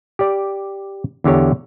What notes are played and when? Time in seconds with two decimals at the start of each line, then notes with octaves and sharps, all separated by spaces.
0.19 G4 D5
1.24 E2 D3 G4 C#5